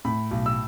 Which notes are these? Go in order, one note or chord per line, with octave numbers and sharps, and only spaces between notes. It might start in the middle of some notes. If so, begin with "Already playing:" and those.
A2 B5
B1
E6